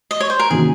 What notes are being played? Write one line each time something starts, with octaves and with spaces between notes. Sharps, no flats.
D#5
C#5
C5
A#4
C3 D#3 A#3 C#4 F#4 G#4